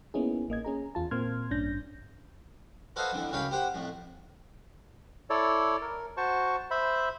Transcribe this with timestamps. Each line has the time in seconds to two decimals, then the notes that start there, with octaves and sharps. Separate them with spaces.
0.14 A#3 B3 C#4 D#4 E4 G#4
0.48 A1 A#3 D#5 G#6
0.65 C#4 G#4 A#5
0.95 E2 F4 A5
1.11 A#2 A#3 C4 C6 F6 G#6
1.51 A1 G2 C#4 D4 G6 A#6
2.96 F#4 A4 B4 C5 D#5 F5
3.12 F2 D3 E3
3.31 C#2 F#2 C#5 F5 G5 B5
3.51 G4 C5 F#5
3.74 F2 A2
5.30 E4 A4 C#5 D5
5.81 A#4
6.17 F#4 C5 A5 C#6
6.71 C5 E5 B5